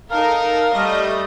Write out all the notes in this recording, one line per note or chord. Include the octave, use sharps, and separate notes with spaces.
D#4 A4 A#4 F5
G3 A3 D#5